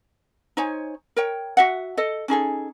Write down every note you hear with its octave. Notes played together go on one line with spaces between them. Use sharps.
D#4 C5 C#5 G#5
A#4 C#5 G5
F#4 E5 F#5
A4 D#5
C#4 D#4 G#4 A4